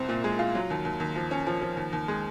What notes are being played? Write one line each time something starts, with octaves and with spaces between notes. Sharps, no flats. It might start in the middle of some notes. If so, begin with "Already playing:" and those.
Already playing: C2 C4
A#2
G#3
F4
F#3
D#2
D#2
D#2
F3
C#4
F3
F3
D#2
D#2
G#3